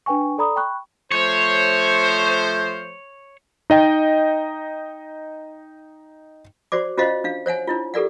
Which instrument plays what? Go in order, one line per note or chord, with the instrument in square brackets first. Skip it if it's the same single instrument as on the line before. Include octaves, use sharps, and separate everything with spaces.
[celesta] D4 B4 G5 G#5 C#6
A4 D5 A#5 B5 D#6
G5 B5 C#6 F#6
[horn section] F3 A3 C5 [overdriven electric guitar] C#5
[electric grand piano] D#4 D#5 G5
[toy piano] F#4 C5 D5 D6
C#4 F4 F#4 C5 D#5 F5
D4 F5
C5 C#5 F#5 G#5
D4 E4 F4
G4 A4 A#4 D5 F#5